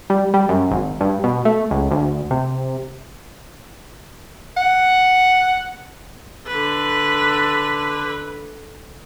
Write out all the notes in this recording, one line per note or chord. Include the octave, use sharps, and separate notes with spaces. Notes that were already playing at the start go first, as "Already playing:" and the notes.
G3
G3
F#2
G#1
G2
B2
A3
C#2
D2
C3
F#5
D3 B4